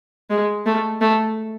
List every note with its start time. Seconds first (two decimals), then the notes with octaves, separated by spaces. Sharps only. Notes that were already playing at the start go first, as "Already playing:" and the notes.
0.30 G#3
0.66 A3
1.01 A3